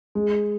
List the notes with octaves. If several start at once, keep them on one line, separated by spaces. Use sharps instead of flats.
G#3